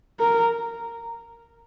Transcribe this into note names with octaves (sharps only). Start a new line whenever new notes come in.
A#4